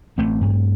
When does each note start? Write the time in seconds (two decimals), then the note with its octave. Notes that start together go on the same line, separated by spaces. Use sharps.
0.18 A1 A3 C4
0.41 G2